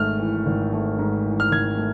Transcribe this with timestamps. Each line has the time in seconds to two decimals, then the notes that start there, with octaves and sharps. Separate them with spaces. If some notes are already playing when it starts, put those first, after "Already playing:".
Already playing: G#1 G#2 A3 F6
0.20 E3
0.46 G#1
0.73 A3
0.99 G#2
1.26 E3
1.40 F6
1.51 G#1 G#6
1.78 A3